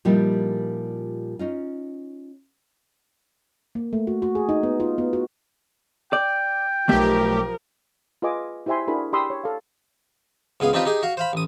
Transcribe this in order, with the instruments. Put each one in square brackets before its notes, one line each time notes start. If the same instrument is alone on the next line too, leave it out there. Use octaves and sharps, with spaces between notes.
[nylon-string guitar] A#2 F3 G3 D#4 E4 G4
C#4 D#4 F4
[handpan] A#3
A3
F#4
F#4
G#4
D#4
B3
F4
B3
F#4
[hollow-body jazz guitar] D5 [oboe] G5
[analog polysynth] B1 G4 [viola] F3 A#4 [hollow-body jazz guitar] A3 E5
[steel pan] F4 G#4 B4 D#5 G#5 D6
E4 G4 C5 E5 G#5 C6
D4 E4 F#4 G#4 A#4 B5
G4 B5 C6 D#6 E6
C#5
A4 F5
[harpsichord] C#2 B3 G#4 F5
C4 D4 D#4 F4 G4 B4
D#4 G4 G#4
F#4 F5
C5 F5 B5
A1 D#6